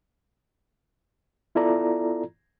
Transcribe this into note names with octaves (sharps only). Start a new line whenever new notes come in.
B3 E4 F4 A4 D5 A#5